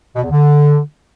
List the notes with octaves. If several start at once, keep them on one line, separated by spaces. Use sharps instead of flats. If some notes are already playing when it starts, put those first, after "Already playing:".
B2
E2
D3